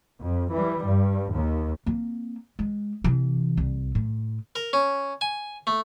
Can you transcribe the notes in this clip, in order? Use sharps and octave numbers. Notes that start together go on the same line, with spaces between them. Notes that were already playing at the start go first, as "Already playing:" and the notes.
F2
E3 G3
G2
D#2
A#3 C4
G#3
C3 E3
C2
A2
A#4
C#4
G#5
A3